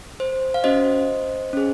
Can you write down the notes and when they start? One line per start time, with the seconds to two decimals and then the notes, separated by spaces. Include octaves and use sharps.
0.20 C5
0.54 F5
0.64 C#4 F#4 C5 D#5
1.53 C#4 G#4